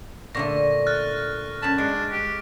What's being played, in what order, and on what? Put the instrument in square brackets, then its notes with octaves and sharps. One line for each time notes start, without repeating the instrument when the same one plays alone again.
[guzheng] A#2 D3 A3 [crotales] C#6 A#6
[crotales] F6 F#6 A6
[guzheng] F#2 B5 [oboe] A5
[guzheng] G#3 [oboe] D4
[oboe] G4